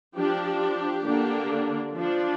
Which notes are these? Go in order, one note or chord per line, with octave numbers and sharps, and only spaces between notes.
F3 D4 G4
G4
D3 A#3 D4
F3 D4